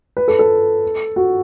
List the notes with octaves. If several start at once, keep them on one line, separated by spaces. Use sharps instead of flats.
B4
A4
A4
F#4